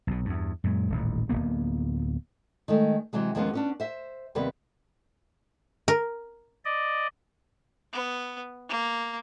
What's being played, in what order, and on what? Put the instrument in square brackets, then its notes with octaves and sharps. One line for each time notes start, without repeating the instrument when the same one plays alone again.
[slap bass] B1 B2
E2 G2
F#2 A#2 D3 G#3
D#1 A1 D#2
D1 G2 A#3 B3
[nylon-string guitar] D#3 G#3 A3
C3 E3 F#3 G#3
D#2 F3 G#3 A#3 B3 C#4
B3 C#4 D4
C5 E5
D#2 C3 G3 B3 B4
[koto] A#4
[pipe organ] D5 D#5
[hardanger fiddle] B3
A#3